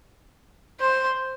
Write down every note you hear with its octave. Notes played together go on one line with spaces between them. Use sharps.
C5